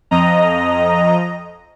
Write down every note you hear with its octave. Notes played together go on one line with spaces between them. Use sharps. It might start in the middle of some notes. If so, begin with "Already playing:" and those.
F2 D#5 A#5